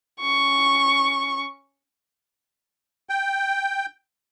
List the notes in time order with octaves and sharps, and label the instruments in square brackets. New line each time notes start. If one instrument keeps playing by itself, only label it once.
[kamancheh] C#4 C#6
[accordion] G5